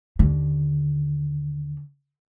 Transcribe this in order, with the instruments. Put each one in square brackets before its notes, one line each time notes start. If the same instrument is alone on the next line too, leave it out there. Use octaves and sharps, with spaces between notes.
[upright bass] D#2 D3